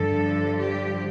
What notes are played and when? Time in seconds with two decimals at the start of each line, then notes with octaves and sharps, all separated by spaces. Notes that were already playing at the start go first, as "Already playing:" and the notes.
Already playing: G2 D3 F3 A4
0.57 G4